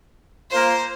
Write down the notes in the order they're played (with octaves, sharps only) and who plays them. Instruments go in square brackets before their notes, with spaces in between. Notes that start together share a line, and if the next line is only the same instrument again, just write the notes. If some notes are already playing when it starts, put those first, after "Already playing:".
[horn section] A#3 F4 A#4 [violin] C5